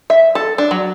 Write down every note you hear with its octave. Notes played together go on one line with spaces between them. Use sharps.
E5
A4
D4
F#3